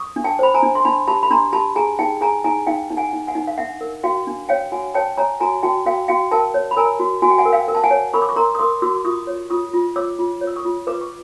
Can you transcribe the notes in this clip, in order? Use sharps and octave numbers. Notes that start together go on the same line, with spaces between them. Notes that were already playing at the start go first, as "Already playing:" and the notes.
Already playing: C#6 D#6
D4
G5 A5
C5 B5
G#5 A#5
D4
C6
D4 A5 B5
G4 A5 B5
B5
D4 A#5 C6
G4 A5 B5
G#4 G#5 A#5
D#4 G5 A5
G#4 G#5 A#5
D#4 G#5 A#5
D#4 F5 G5
D#4
F#5 G#5
D#4
F#5 G#5
D#4
F5
D4 E5 F#5
A#4
F#4 F5 G5
D4
C#5 F5 G5
F#4 F#5 G#5
C#5 G5 A5
C#5 G#5 A#5
F#4 G#5 A#5
F#4 G5 A5
F#4 F5 G5
F#4 F5 G5
A#4 G5 A5
C#5
B5
A#4 G#5 A#5
F#4
F#4 G#5
G5
F#5 G#5
A#4
F5 G5
A#4
A5
F#5 G#5
C#5
A#4 B5 C#6
D6
C#6
A#4 A#5 C6
D#6
A#4 C6 D6
F#4 D6 E6
F4 C#6 D#6
C#5
F4 C#6 D#6
F4
C#5 D6 E6
F4
C#5
E6
C#6 D#6
F4
B4 D6
C#6